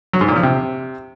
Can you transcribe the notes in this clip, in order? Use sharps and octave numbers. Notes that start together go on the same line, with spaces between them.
F#3
G#2
A#2
F3
C3